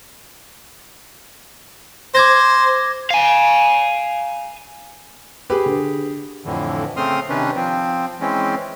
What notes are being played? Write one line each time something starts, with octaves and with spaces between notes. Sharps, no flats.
C5 D6 G#6 A#6
F5 G#5
G4 G#4 B4
D3
F2 A2 D3 E3
C#3 A3 C4 C6 D#6 F6
C3 D#3 C#4 D4 B4
F3 C4
E3 G#3 C4 C#4